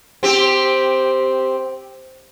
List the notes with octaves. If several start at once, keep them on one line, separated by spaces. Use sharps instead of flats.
C4 G4